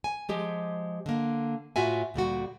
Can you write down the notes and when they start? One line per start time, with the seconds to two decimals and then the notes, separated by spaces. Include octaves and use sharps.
0.04 G#5
0.29 F3 G#3 G4
1.06 D3 A#3
1.76 A2 F4 F#4 E5 G#5
2.14 D2 A#2 G3 F#4